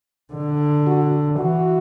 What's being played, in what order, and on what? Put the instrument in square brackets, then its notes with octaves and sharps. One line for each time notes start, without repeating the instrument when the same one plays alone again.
[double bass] D3
[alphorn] F#4
[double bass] E3 [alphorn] F#4